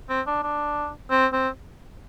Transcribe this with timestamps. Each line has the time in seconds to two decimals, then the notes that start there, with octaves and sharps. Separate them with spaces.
0.10 C4
0.27 D4
0.43 D4
1.11 C4
1.33 C4